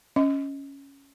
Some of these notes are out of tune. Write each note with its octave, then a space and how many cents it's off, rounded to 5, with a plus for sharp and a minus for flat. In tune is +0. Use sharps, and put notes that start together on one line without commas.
C#4 +0 D#5 +15